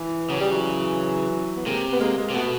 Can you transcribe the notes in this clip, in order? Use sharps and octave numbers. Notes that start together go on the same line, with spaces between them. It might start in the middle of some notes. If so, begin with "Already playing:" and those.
Already playing: E3
C#3 F#3
G3
E3 F#3
B3
C3 G#3 A#3
B3
G#3 A#3
G#3 A#3
C3
B2 A3 B3